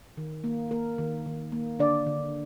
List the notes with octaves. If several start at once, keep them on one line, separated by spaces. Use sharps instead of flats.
D#3
A#3
A#3 A#4
D#3
D#3
A#3
D3 D4 D5
D3